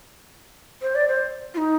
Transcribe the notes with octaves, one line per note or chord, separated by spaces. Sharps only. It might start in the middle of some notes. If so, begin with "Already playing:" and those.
C5
D5
C5
F4
D#4